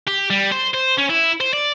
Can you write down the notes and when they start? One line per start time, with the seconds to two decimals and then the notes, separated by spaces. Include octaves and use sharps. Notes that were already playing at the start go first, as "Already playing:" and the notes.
0.07 G4
0.30 G3
0.52 C5
0.74 C5
0.98 C#4
1.10 E4
1.41 C5
1.53 D5